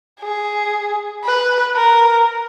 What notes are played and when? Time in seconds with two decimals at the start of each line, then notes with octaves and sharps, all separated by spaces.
0.21 G#4
1.25 B4
1.76 A#4